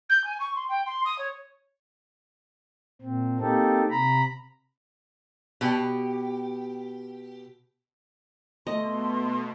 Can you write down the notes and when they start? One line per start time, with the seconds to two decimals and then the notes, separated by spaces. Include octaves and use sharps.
0.09 G6
0.24 G#5
0.40 C#6
0.56 C6
0.69 G5
0.86 C6
1.05 D#6
1.18 C#5
3.02 A#2 C4
3.40 A#3 C4 D#4 G4 A4
3.90 C3 A#5 B5
5.61 B2 G4
8.67 B2 A3 D#5 C6